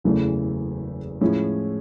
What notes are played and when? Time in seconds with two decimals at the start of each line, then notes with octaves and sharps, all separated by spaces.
0.04 F#1 E2 C#3 E3 A3
1.21 A2 F3 G#3 C#4 E4